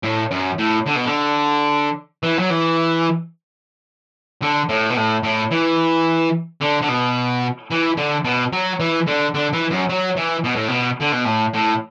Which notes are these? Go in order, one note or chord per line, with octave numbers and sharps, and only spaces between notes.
A2
F#2
A2
D3
B2
D3
E3
F#3
E3
D3
A2
B2
A2
A2
E3
D3
D3
B2
E3
D3
B2
F#3
E3
D3
D3
E3
F#2
F#3
E3
B2
A2
B2
D3
B2
A2
A2